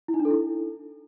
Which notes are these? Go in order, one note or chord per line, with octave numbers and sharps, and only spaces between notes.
E4
D#4
D4
A4
E4